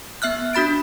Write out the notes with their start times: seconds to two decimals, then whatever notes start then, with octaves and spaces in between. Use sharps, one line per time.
0.22 B3 E5 F6 F#6
0.53 D4 F#4 B5 A6 D7